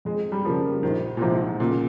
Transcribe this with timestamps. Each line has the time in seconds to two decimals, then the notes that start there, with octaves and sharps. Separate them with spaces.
0.05 F2 G#3
0.32 G3
0.44 C#3 F3 G3 A#3
0.83 A#1 D#3
1.17 A#2
1.21 G#2 C3 F3
1.60 A#2 C#3